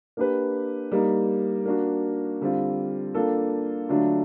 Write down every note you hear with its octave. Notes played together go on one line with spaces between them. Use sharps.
A#3 D4 G4 B4
G3 A#3 D#4
A#3 D4 F#4
D3 G3 C4 F4
A#3 D4 F4 A4
D3 F#3 A3 D4 F4